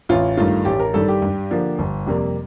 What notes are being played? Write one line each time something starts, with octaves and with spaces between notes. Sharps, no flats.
A1 F4
G2 D#3 A3 F4
A1 G4
A#4
G2 D#3 G3 A4
G4
G2
D3 F3 A#3
G1
F2 C3 G3 A#3